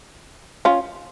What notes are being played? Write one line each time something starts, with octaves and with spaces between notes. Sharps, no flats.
C#4 F4